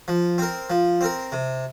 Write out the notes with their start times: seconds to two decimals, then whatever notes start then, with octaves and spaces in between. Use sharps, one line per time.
0.08 F3
0.38 C4 A#4
0.70 F3
1.01 C4 A#4
1.32 C3